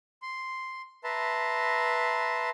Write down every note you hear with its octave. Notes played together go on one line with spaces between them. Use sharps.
C6
B4 E5 A5 A#5 C6